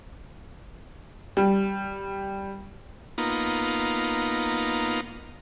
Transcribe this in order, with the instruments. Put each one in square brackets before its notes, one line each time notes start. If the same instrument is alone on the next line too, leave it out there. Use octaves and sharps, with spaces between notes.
[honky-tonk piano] G3
[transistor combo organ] A#3 B3 D#4 F4